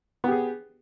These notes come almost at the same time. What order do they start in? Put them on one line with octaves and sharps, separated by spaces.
B3 G4 G#4